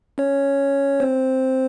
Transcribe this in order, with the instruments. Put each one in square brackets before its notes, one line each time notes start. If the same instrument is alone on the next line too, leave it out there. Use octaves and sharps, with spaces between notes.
[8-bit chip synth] C#4 C#5
C4 C5